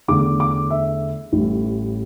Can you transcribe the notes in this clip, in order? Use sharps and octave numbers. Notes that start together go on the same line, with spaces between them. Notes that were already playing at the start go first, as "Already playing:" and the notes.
E2 D3 A3 D6
D6
E5
A1 A2 G3